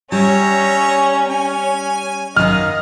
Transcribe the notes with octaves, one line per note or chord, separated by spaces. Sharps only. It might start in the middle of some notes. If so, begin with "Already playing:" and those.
G3 C#4 C#5 E5 A#5
C#4 G#5
F#2 D#3 D#4 D#5 F5 F6